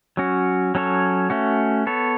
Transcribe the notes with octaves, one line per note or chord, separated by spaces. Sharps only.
F#3 C#4 F#4
F#3 C#4 A4 C#5
A3 C#4 F#4
B3 A4 C#5